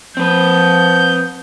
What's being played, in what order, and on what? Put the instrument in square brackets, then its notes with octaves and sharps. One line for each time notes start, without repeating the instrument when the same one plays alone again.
[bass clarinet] F3 [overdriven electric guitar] C4 B4 [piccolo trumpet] G6